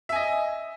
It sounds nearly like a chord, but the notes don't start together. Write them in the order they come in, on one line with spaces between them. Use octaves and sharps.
E5 G#5 D#5